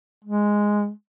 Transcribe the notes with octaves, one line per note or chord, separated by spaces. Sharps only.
G#3